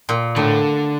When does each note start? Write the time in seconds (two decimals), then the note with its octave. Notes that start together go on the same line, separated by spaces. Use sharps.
0.09 A#2
0.36 A2 D3